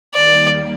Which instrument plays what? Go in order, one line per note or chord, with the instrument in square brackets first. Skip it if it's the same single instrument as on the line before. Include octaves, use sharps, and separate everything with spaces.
[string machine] D#2 D#3 G3 A#3 [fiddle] D5